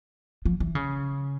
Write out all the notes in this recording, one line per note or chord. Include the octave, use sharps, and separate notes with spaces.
F3
E3
C#3